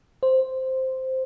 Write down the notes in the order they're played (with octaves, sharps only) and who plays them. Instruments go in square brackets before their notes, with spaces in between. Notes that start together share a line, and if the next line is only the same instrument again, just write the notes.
[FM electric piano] C5